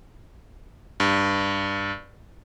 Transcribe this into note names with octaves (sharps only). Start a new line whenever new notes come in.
G2